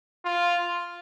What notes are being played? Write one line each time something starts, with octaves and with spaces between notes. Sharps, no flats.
F4